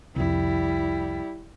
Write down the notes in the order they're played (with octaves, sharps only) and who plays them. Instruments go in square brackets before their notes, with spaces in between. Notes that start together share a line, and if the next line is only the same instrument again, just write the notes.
[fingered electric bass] C2 F2 [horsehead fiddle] G3 E4